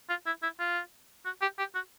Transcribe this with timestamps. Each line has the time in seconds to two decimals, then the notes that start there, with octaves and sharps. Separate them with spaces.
0.09 F4
0.26 E4
0.43 E4
0.59 F4
1.25 F#4
1.42 G4
1.59 G4
1.75 F#4